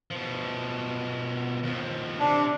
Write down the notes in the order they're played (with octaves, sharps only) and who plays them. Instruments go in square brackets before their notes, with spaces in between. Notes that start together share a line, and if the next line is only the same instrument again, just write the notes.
[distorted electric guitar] B2 F3
D#2 F3
[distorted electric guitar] C3 [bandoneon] D4